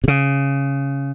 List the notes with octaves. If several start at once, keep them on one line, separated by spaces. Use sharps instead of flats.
C3
C#3